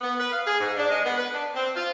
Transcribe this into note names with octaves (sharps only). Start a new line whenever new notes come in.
B3
B4
F5
G#4
G#2
D4
G#3
B3
B4
D4
C4
F4